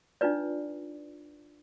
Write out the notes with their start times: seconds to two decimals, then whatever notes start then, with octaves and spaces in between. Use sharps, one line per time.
0.21 D4 D#4 F4 B4 D5